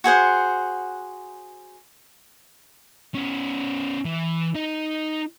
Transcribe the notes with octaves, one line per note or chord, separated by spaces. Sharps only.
F#4 G#4 C5 F#5
B3 C#4
E3
D#4 D#5